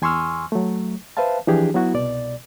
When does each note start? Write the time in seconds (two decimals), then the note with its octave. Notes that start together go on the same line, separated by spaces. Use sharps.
0.02 E2 G#5 C6 C#6 E6 F6
0.52 F#3 A3
1.17 B4 C5 E5 F5 A5
1.47 E3 F3 D4 G4 G#4
1.74 F#3 B3 E4 F#4
1.94 C2 B2 D5